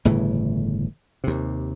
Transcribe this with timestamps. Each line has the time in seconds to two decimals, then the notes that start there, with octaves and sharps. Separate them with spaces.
0.05 G1 A2 C#3 E3
1.24 D#2 C3